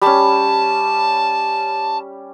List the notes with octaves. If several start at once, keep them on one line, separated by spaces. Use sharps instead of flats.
G3 C#4 A5